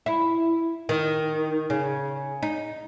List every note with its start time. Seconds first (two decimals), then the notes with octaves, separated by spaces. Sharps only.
0.06 E4
0.89 D#3
1.70 C#3
2.43 D#4